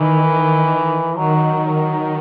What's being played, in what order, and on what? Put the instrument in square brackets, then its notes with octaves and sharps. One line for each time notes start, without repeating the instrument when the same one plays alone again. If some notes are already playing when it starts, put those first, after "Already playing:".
Already playing: [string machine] D#3 [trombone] E3
[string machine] D#3 [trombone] F#3
[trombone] F#3